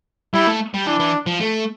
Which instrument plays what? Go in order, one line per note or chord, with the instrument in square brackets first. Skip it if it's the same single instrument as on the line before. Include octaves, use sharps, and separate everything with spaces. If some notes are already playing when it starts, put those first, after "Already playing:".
[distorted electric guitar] G3 [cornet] E4
[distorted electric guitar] A3
G3
[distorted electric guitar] E3 [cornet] D4
[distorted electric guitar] E3
F3
A3